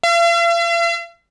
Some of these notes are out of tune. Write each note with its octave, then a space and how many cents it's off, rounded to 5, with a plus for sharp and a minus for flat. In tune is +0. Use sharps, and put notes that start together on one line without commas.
F5 -45